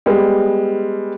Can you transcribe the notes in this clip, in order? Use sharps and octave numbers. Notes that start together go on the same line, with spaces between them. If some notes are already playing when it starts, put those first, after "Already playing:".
G3 G#3 B3